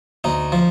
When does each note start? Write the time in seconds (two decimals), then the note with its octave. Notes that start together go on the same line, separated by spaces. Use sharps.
0.24 D2 D#4
0.52 F3